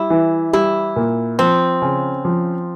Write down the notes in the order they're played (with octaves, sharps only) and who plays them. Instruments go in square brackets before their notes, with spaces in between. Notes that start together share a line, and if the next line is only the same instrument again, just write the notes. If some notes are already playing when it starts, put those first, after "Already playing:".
Already playing: [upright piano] G3 [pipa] E4
[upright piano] E3
[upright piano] G3 [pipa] E4
[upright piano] A#2
[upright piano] F3 [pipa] C4
[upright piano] C#3
F3